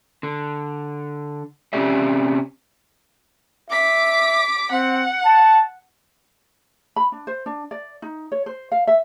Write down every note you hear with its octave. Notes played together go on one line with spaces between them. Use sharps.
D3
C3 C#4 G4 D5 E5
E5 D6 B6
C4 F#5
A5
B5
D4
C5
D4
D5
D#4
C#5
C5
F5
E5